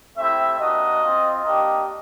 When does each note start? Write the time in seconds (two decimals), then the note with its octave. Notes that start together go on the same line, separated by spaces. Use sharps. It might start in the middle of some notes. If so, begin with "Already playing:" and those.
0.17 A3 C4 E4 G4 E5
0.59 A#3 D4 F#4 D#5
1.03 C4 F4
1.44 A#3 D4 G4 D#5